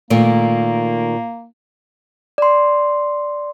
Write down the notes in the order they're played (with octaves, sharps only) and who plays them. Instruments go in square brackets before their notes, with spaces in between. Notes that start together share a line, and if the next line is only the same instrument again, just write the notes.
[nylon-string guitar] A#2 D#3 A3 [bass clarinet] A#3
[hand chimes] D5 C6